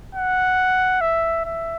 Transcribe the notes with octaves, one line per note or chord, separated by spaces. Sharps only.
F#5
E5
E5